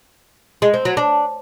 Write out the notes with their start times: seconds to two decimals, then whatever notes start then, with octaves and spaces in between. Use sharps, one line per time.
0.62 G#3
0.74 C4
0.85 F#3
0.97 D4